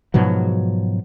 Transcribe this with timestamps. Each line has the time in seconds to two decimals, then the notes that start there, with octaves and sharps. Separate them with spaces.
0.14 G#2 B2 F3 F#3